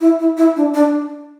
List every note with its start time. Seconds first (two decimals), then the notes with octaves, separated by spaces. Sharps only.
0.01 E4
0.20 E4
0.37 E4
0.56 D4
0.74 D4